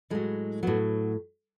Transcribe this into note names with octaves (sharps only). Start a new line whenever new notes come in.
A2 F#3 G#3
A2 F#3 B3